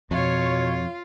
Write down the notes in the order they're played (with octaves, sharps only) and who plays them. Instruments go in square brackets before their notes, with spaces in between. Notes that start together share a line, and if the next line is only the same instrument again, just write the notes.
[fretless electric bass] F2 [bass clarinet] B2 [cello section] F3 C#5 [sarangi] F4